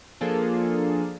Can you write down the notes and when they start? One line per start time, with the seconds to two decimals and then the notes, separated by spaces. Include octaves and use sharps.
0.21 F3 A#3 D4 F4 G#4 A4